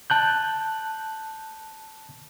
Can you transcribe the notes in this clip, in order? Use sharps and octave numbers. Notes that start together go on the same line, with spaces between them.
A5 F#6 G6